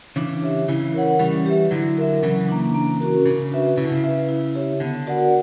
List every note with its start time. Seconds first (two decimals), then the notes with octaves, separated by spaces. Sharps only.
0.16 C#3 E3 D4
0.42 G4 C#5 E5
0.68 C#3 E3 E4
0.94 A#4 C#5 F#5
1.19 E3 G3 C#4
1.46 G4 B4 E5
1.71 D3 F#3 E4
1.98 A#4 E5
2.23 C#3 E3 F#3
2.49 A#3 D4
2.74 A#3
3.00 C#4 F#4 A#4
3.25 C#3 D4
3.52 F#4 B4 E5
3.77 C#3 E4
3.84 D3
3.92 C#3
4.04 B4 E5
4.29 E4
4.55 G4 C#5 E5
4.80 D3 B3
5.07 F#4 A#4 D5 F#5